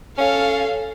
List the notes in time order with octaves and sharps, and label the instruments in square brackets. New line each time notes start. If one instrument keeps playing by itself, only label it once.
[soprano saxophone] C#4 [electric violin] A4 F5